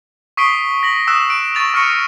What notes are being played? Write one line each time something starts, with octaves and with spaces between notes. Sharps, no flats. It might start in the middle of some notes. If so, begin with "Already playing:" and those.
C#6 D#6 B6 C7 D7 G7
A#6 B6 F#7
D#6 E6 F#6 E7
D7 E7
C#6 A6 F7
C#6 F6 A#6 C#7 D#7